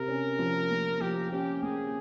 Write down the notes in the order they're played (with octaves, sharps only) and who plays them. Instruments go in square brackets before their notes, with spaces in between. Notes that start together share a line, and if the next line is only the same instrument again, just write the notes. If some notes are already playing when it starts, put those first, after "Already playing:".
Already playing: [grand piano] C3 [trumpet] A#4
[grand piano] C#4
F3
A#3
[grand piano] F3 [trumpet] G4
[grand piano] C#4 [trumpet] G4
[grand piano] A#3 [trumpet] G#4